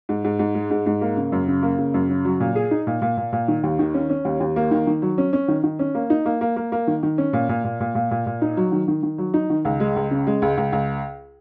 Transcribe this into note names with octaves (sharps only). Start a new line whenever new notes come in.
G#2
G#2
G#2
G#3
G#2
G#2
A#3
C#3
F#2
C#3
A#3
C#3
F#2
C#3
F#3
A#2
G#4
D#4
A#2
A#2
A#2
A#2
D#3
D#2
D#3
C#4
C#4
D#2
D#2
A#3
D#3
D#3
F#3
C#4
C#4
D#3
D#3
C#4
A#3
D#4
A#3
A#3
A#3
A#3
D#3
D#3
C#4
A#2
A#2
A#2
A#2
A#2
A#2
A#2
D#4
F#3
D#3
D#3
D#3
F#3
D#4
D#3
C#2
G#3
C#2
C#3
G#3
C#2
C#2
C#2